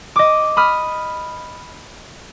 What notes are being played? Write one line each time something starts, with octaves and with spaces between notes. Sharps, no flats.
D#5 D6
B5 D#6 F6